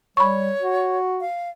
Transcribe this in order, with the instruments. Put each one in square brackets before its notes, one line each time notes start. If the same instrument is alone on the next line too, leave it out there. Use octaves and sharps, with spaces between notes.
[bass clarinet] G3 [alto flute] C#5 [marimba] B5 C#6
[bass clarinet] F#4
[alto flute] F5